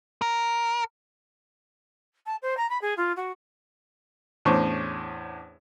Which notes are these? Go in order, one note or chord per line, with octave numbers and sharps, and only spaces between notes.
A#4
A5
C5
A#5
B5
G#4
F4
F#4
E2 A2 C#4 D4 C5 C#6